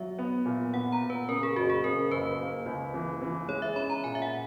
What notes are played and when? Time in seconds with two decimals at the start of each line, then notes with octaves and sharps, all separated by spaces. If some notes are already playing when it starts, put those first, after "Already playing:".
Already playing: F#3 E5
0.19 B3
0.46 A#2
0.74 B3 F#5
0.92 A#5
1.01 A#2
1.10 B4
1.28 C#3 A#4
1.43 G#4
1.56 F#1 F#4
1.69 G#4
1.84 C#3 A#4
2.11 F#1 B4
2.38 A#3
2.66 C#2
2.94 E3
3.21 E3
3.48 G#3 C#5
3.62 E5
3.76 C#4 B5
3.90 A#5
4.04 A#2 G#5
4.15 E5
4.22 F#5